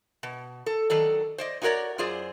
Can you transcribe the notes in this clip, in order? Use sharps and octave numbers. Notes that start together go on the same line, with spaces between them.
B2
A4
D#3 F#3 A4 D5
C5 D5 D#5
D#4 E4 F#4 A#4 C#5 D5
F#2 F4 G#4 C5 D5